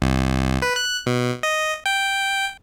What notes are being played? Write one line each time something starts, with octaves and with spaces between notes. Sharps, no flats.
C2
B4
F#6
B2
D#5
G5